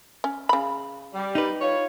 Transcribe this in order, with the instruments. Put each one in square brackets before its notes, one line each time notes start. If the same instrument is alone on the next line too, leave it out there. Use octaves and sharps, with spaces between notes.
[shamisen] C#4
C#3 B5
[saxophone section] G3
[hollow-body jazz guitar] D#4 B4
[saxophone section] F4 C#5